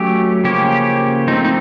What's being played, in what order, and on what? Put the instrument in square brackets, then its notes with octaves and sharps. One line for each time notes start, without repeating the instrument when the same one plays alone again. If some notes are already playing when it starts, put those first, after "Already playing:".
Already playing: [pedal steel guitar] F#3 A3 C#4 G4
C#3 F3 A#3 C#4 G4
F3 A3 C4 D#4
D#4